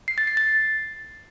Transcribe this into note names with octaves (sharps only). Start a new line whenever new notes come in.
C7
A6
C7
A6